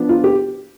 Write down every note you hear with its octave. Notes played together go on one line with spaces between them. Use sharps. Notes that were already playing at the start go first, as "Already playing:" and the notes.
Already playing: F3 B3 D4
F4
G4